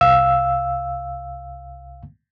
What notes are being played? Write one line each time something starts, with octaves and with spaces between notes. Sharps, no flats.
C2 F5 E6